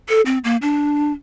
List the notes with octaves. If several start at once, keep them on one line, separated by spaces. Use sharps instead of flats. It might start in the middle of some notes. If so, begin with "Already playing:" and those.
A4
C4
A#3
D4